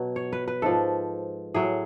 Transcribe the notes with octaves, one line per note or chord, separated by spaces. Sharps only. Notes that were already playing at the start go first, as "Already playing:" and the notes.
Already playing: B2 F#3
C#5
B4
B4
G#2 F3 A4
A2 F#3 G#4